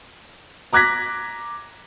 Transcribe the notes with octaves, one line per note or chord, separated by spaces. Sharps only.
A#5 D6 F#6 G#6 A#6 B6